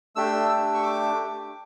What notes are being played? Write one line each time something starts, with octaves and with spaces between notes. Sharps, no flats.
A3 D4 G4 E6
E6
C#6
D6